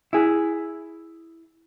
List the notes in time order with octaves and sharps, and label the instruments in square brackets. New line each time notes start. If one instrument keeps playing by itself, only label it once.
[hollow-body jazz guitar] E4 G#4